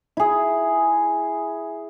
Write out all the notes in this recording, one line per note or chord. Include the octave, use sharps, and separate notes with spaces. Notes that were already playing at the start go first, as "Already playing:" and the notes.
E4 G#4